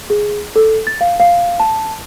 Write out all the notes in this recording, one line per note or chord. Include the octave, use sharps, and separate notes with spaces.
G#4
A4
A6
F5
F5
A5